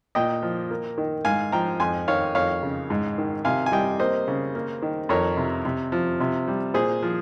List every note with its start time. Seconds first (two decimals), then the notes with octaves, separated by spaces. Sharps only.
0.15 A#2 D#5 G5
0.42 F3
0.71 A#3
0.98 D#3
1.25 G#2 F5 G#5
1.52 F3 G5 A#5
1.80 F2 G#5 C6
2.08 D#3 C#5 F5
2.35 F2 C#5 F5
2.63 C#3
2.90 G#2
3.18 D#3
3.45 C3 F5 G#5
3.66 G#5
3.72 G3 D#5 G5
4.00 A#3 C5 D#5
4.28 C#3
4.55 A#3
4.82 D#3
5.09 F2 A#4 C#5
5.37 C3
5.65 C3
5.92 F3
6.20 C3
6.48 G3
6.74 A#2 G#4 C5
7.03 F3